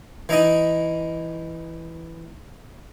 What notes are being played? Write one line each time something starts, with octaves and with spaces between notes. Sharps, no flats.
E3 D#4 E4 D#5 D#6